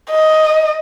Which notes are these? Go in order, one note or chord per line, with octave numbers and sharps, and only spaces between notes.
D#5